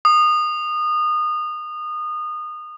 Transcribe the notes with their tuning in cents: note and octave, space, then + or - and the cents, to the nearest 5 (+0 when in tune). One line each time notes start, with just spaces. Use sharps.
D#6 -25